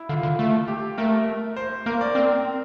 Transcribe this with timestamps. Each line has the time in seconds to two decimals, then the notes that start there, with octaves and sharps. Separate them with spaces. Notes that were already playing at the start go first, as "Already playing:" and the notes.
Already playing: E4
0.09 D3 F4
0.23 D3
0.39 A3
0.68 G4
0.98 A3 A#4
1.57 C5
1.86 A#3 A#4
2.01 D5
2.15 C4 A#4